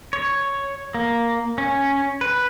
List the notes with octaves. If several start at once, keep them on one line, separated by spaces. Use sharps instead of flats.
C#5
A#3
C#4
B4